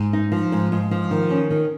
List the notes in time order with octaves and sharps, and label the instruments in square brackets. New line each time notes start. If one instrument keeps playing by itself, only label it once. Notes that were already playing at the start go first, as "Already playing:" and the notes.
Already playing: [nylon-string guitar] G#2
D#4
F3
G#2
G#2
F3
D#3
C#4
D#3